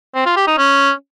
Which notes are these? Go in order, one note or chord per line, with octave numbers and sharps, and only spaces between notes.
C4
F4
G4
D#4
C#4